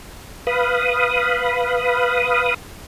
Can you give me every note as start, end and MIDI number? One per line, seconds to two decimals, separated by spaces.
0.47 2.54 71
0.47 2.54 77
0.47 2.54 83
0.47 2.54 87